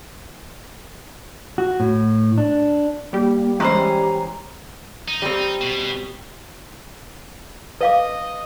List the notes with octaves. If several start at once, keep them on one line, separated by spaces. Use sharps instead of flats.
F#4
A2
D4
G3 A#3 G4
E3 G#3 C#4 C5 A#5
D#4
G3 C4
B2
B4 D#5 F5 D6